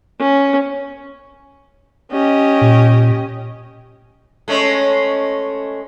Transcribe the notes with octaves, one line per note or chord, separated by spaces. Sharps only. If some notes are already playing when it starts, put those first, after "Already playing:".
C#4
C#4 G4 D#5
A#2
G#3 A3 C#4